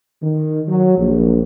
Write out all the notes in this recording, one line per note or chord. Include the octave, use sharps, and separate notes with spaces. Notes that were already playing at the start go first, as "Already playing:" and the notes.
D#3
F#3
A#1